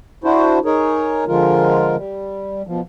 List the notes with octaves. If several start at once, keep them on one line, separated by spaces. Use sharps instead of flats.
D4 E4 F#4 C5
D#4 G#4 A#4 C#5
D3 F3 G#3 F4 A#4
G3
B2 F3